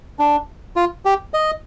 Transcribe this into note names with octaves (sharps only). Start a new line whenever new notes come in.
D4
F4
G4
D#5